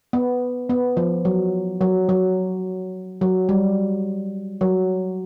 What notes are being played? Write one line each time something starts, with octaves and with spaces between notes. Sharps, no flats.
B3
B3
F3
F#3
F#3
F#3
F#3
G3
F#3